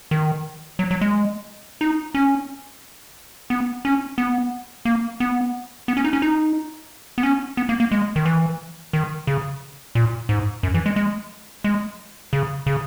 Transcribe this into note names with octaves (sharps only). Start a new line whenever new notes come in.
D#3
F#3
F#3
G#3
D#4
C#4
B3
C#4
B3
A#3
B3
B3
C#4
D#4
C#4
D#4
B3
C#4
B3
A#3
A#3
G#3
D#3
E3
D#3
C#3
A#2
G#2
F#2
E3
G#3
G#3
G#3
C#3
C#3